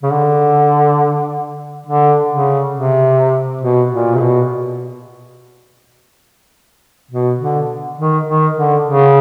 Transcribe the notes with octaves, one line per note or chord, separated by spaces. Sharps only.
C#3
D3
D3
C#3
C3
B2
A#2
C3
B2
B2
D3
D#3
D#3
D3
C#3